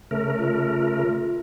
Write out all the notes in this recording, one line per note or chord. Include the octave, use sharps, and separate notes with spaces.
C#3 A3 A#4
F4